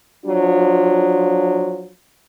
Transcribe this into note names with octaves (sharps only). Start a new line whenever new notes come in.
F3 F#3 D4 F4